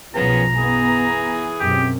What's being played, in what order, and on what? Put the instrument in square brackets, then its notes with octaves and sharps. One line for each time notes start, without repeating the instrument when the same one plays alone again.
[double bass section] B1 F#2 F3 [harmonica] B3 C#4 G#4 [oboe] A#5
[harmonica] E3 G#4 G#5 [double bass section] B3
[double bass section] F#2 B2 C4 [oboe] G4